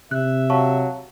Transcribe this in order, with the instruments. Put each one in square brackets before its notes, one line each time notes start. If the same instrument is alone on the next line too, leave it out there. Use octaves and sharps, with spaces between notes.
[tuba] C3 [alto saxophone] E5 [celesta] F#6
[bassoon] F#3 [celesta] F5 A5 C#6